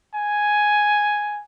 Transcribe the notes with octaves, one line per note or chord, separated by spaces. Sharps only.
G#5